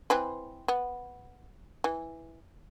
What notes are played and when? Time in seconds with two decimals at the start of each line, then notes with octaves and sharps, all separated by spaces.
0.10 E3 C4 B4
0.68 B3
1.84 E3